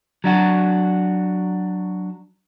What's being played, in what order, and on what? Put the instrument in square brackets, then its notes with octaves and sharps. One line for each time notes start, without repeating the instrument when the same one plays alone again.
[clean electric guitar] F#3 D4 F#4